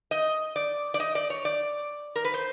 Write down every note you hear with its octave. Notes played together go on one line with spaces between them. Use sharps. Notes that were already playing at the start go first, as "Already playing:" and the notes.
D#5
D5
D5
D#5
D5
C#5
D5
A#4
B4
C5